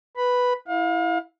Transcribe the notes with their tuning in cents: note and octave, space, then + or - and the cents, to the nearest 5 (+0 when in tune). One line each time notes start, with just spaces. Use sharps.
B4 +0 B5 +0
E4 +0 F5 +35